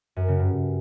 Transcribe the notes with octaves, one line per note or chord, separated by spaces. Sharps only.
F#2
C#3
G2